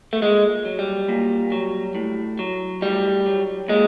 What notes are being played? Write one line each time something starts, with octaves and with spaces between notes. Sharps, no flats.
A3
A#2 G#3
F#3
G3
A#2
F#3
A2
F#3
A2 G3
F#3
A#2 G#3